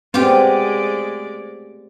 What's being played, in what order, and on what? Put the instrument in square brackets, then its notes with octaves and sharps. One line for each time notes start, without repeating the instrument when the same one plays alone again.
[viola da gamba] G#3 A3 D5 [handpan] B3 C4 [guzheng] F4 G4